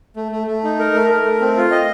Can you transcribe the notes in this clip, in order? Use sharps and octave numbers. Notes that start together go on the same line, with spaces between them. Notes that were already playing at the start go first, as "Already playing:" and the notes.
A3
A3
A3
D#4
A#4
A3
A#4
A3
C4
F4
D#5